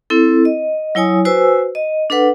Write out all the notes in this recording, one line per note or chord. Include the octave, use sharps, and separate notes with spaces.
C4 E4 A4
D#5
F#3 E4 C#5 G#5 D#6
F#4 B4 C5 G#5 E6
D#5
D4 A4 B4 F#5